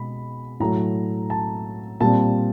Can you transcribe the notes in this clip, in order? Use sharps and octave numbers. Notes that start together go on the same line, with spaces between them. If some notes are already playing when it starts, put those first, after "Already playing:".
Already playing: B2 G#3 B5
A2 F#3 A3 A#5
A5
A#2 G3 C4 A5